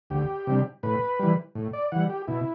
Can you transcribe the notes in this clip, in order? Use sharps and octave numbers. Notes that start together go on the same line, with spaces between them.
D2 G4
C3 G3 D4
A2 B4
E3 G3
A2
D5
E3 G3 F#5
G4
B2 E4